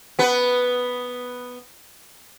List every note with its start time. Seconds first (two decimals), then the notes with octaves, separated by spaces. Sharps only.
0.19 B3 B4